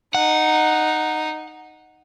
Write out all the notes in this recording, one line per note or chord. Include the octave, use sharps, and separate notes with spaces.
D#4 F#5